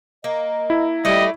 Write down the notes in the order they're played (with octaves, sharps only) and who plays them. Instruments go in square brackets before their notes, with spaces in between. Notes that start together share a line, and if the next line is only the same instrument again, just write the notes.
[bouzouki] A#3 [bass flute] D#5
[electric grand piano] E4
[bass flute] G3 [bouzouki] A3 D5 [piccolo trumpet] D#5